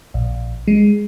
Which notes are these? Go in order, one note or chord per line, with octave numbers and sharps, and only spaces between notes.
A#1
G#3